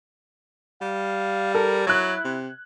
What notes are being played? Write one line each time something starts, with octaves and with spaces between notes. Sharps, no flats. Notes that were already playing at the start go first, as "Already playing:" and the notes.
G3 F5
A4 A#4
F#3 E4 F#6 G#6
C3